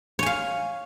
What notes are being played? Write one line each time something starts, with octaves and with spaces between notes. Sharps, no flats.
C#5 F5 G#5